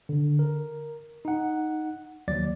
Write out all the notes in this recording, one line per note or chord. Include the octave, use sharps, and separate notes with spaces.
D3
A#4
D#4 F#5
D#2 F#3 D5 A6